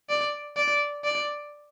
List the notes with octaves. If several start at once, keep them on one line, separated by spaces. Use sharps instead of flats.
D5
D5
D5